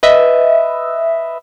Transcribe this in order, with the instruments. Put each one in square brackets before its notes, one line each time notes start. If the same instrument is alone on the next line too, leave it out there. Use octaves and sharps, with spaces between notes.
[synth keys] B4 D#5 E5